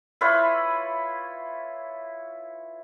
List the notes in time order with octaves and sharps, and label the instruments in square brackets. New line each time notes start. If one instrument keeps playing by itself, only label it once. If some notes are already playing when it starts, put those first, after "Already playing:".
[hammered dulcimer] E4 F4 B4 C#5